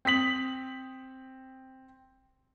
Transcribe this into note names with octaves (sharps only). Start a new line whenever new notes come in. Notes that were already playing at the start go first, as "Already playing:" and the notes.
C4 D#6 B6 F#7